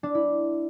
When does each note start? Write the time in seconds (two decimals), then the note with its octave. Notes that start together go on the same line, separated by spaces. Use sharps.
0.03 D4
0.15 E4